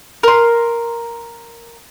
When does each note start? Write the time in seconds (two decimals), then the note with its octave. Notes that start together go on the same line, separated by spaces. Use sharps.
0.23 A#4 C6